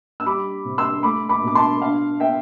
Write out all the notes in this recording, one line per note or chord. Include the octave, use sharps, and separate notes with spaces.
E6
G3 B5 D6
C3
C6 E6
A3 B5 D6
B5 D6
B2 D6
A5 C6
D4 F5
B3 E5 G5